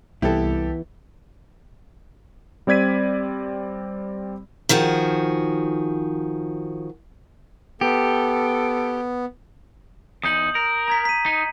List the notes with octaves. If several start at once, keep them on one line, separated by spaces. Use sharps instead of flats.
C2 E3 B3 E4 G4 A4
G3 C4 D5 G#6 B6 D#7
D#3 F3 F#4 G#4
B3 G4 A4
E2 D#4 D#6 G6 F#7
A#4
A#5 G#6 B6
B6 D#7
D#4